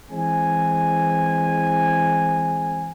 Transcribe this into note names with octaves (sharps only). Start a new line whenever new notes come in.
E3 G#3 C4 G#5